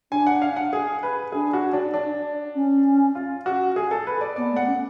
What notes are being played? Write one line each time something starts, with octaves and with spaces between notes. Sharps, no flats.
D4 G#5
F#5
F5
F#5
G#4
B4
D4 G#4
F#4
D4
D4
C#4
F4
F#4
G#4
A4
B4
D5
B3 D5
A3
F#5
C#4